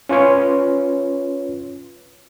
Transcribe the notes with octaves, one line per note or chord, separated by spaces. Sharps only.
C#4 F4 B4 C#5 C6